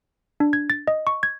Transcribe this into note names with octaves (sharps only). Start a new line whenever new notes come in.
D4
G#6
A6
D#5
C#6
G#6